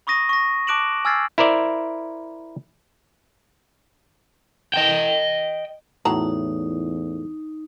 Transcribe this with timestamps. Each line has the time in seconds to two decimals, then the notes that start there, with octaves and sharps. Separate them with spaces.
0.07 B5 C#6 D#6 A#6 D#7
0.29 C#6 A#6
0.67 A5 D6 F#6 D7 E7 F#7
1.05 G#5 E6 F6 G#6 A6 C7
1.38 E4 A#4 C5 D5 E5
4.74 D#5 G5
6.05 E2 A2 F#3 D#4 A5 A#5